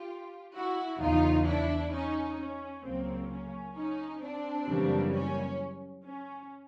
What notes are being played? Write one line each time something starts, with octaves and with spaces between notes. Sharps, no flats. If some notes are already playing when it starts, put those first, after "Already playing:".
Already playing: F4 G4
E4 F#4
E2 C#3 E3 D#4 F4
D4 E4
C#4 D#4
C#4
C#2 C#3 F#3 A#3 C4
C#4
C#4 D#4
C4 D4
F#2 C#3 E3 G3 A#3
C#4
C#4